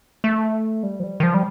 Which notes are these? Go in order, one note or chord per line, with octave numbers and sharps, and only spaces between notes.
A3
G3
F3
G3
D#3
F3
G3